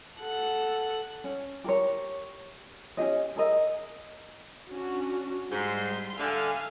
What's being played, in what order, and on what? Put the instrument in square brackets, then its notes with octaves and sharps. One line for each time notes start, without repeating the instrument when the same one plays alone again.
[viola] A4 F#5
[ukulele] C#4
G4 A#4 C#5
C#4 D4 G4 D#5
G#4 A#4 D#5 E5
[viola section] C#4 D4 F#4
[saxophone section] G#2 [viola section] G3 C6
[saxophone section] D3 [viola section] E5 F5 G#5